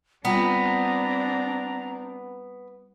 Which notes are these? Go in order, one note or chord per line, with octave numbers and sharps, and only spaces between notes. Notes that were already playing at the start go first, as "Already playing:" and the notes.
G3 B3 C4 D4 F4 A#5